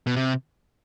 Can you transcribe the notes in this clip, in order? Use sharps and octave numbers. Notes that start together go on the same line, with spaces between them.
B2
C3